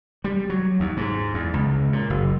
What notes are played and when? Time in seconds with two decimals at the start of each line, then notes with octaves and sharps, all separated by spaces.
0.24 G3
0.50 F#3
0.80 D#2
0.97 G#2
1.34 E2
1.54 C#2
1.93 A#2
2.10 F#1